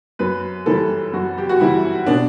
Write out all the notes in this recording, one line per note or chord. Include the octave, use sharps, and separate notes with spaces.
F#2 B4
E3 G3 A4
F#2 F#4
G4
F#4
E3 G3 E4
B2 D4